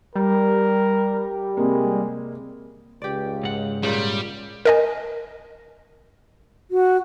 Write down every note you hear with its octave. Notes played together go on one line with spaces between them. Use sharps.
G3 A#4
C3 G#3 A#3
C#2 G4 D5
G#2 F#5
A#2 C#3 G3
A#4 D#5 G#5
F#4